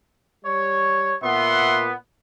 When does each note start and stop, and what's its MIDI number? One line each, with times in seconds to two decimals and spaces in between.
0.45 1.14 55
0.45 1.14 73
1.24 1.92 46
1.24 1.92 59
1.24 1.83 76
1.24 1.83 78
1.24 1.83 84